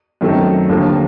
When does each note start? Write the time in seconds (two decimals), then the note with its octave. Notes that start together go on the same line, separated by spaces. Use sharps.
0.21 F#2 D#3 F#3 A3 C4
0.69 D#2 D3 F3 A#3